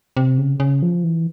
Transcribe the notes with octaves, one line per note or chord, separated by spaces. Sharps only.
C3
C#3
C#3
F3
E3